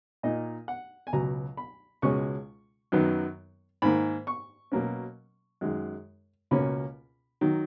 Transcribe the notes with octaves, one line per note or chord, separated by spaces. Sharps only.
A#2 A#3 D#4 D#5
F#5
G#5
C#2 B2 F#3 A#5
B5
C#2 B2 G#3 C#4 C#6
F#2 D#3 F#3 B3
G#2 D#3 A#3 B5
C#6
B2 F#3 A#3 C#4
F#2 D#3 G#3
C#2 B2 A#3 C#4 B5
D#3 F#3